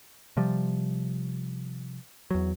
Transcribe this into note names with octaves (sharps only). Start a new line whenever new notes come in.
C3 F3 G3
E2 F#3